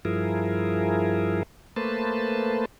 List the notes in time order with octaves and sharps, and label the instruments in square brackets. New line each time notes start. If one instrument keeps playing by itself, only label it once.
[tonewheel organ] G2 F3 E4 G#4 A#4
A3 A#3 B4 C5 A5